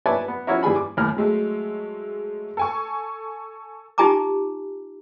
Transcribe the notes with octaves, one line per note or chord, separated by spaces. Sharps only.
B4 C#5 D5 E5 G#5 A5
B3
F3 C#4 E4 F#4 A#4 E5
E3 G3 G#4 G#5 B5
D6
D#2 A2 A#4 G#5 F6
F#3 G#3 A3
A4 G#5 C#6
D#4 F4 G4 G#5 A#5 D6